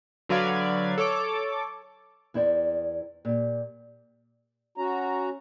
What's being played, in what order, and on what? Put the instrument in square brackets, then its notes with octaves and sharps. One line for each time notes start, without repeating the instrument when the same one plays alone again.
[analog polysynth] D3 F#3 B4 D5 F5 G#6
A4 C#5 D6
[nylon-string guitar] E2 E4 C5 D5 G5
A#2 G4
[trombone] C#4 [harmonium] F#4 A#5